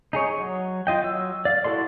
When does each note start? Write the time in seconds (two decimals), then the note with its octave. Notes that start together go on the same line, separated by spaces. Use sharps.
0.13 D#4 G#4 C#5
0.38 F#3
0.87 F4 D#5 G5
1.04 F#3 E6
1.45 D5 F5
1.64 E4 F#4 A4 D5 C6